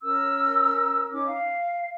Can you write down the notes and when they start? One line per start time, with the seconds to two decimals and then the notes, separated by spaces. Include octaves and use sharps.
0.02 C#4 A#4 E6
1.10 C#4 D#4 D6
1.26 F5